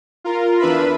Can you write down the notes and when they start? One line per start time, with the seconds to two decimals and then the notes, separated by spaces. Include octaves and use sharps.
0.24 F4 A#4
0.59 E2 D4 B4 E5 B5